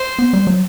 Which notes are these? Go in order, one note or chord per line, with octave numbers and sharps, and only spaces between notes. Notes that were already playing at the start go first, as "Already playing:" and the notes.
Already playing: C5
B3
G3
F#3